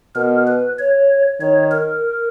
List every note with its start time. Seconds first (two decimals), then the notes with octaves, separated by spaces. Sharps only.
0.16 B2 A#4
0.47 B4
0.78 C#5
1.41 D#3 C#5
1.72 A#4